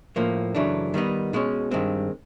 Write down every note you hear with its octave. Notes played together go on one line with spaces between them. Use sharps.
A2 F3 A#3
F#2 C#3 E3 A3 D4
D#3 G3 B3 D#4
B2 G#3 C#4
G2 D#3 G#3 C4